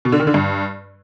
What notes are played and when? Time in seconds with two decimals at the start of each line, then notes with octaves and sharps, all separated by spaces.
0.05 B2
0.12 D3
0.20 D#3
0.27 D3
0.34 G2